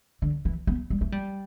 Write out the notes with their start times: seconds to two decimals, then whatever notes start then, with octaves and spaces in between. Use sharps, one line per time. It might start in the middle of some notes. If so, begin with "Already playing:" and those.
0.22 D3
0.45 E3
0.67 B3
0.90 G3
1.01 A3
1.12 G3